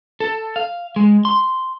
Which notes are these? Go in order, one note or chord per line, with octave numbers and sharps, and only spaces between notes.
A4
F5
G#3
C6